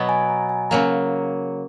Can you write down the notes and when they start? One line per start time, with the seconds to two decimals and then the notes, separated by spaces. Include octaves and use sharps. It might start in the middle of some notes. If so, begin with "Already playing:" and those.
Already playing: B2 F#3 B3
0.09 G#5
0.29 A#5
0.49 G#5
0.70 C#3 F#3 A#3 A#5